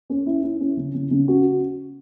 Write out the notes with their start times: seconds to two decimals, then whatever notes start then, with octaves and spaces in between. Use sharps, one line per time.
0.10 C#4
0.26 E4
0.43 E4
0.60 C#4
0.77 C#3
0.95 C#3
1.11 C#3
1.28 F#4